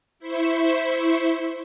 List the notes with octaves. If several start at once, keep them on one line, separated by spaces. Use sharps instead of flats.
E4 C5 E5 C#6